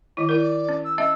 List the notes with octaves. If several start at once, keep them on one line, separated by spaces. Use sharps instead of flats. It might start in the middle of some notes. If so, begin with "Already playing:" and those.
D#3 E4 D#5
E4 A#4 D5
C#4
E6
C#4 D#5 E5 E6